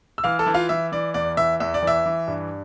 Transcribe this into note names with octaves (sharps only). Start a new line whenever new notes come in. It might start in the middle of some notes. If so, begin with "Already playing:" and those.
E6
E3 F5 F6
A4 A5
E3
F4 F5
E3 E5
E3 D5
E2 D5
E3 E5
E2 E5
D5
E3 E5
E3
G2